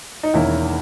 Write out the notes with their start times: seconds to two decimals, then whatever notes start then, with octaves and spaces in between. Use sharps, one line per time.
0.23 D#4
0.34 E1 E2 D#3 A#3 C#4 E4